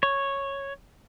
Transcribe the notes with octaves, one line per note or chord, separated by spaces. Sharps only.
C#5